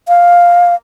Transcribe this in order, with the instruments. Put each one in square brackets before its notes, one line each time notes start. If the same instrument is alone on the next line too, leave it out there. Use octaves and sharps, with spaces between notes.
[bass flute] F5